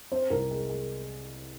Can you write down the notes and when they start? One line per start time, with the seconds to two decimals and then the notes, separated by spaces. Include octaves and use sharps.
0.12 C4 C5
0.30 C2 A#4
0.51 G#3
0.70 G#3